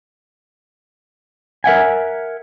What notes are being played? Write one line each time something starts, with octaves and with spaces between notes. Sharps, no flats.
A#4 E5 F#5 G#5